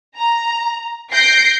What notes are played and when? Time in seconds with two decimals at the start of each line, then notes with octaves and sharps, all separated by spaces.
0.17 A#5
1.12 G6 A#6 C7 D7